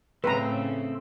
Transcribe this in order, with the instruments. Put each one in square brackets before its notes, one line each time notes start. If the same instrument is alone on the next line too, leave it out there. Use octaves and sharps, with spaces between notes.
[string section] A2 C#3 [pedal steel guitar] A3 C4 [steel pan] B4 A#5